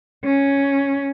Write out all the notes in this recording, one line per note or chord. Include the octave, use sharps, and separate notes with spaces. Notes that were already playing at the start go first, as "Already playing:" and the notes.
C#4